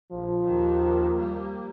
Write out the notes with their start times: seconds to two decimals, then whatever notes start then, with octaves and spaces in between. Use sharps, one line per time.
0.12 A#1 F3
0.44 D#2 D#3
1.15 G3 A#3